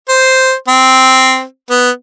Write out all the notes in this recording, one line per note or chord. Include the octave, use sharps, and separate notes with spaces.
C5
C4
B3